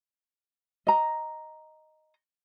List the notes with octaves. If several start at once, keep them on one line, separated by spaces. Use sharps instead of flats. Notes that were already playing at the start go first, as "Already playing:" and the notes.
D#5 A#5